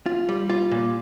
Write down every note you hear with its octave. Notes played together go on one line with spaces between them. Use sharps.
F4
G3
F4
A#2